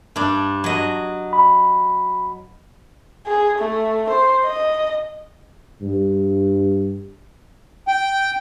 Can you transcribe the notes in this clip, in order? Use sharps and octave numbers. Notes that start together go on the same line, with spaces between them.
G2 D4
F#3 D#5
B5
G#4
A3
C5
D#5
G2
G5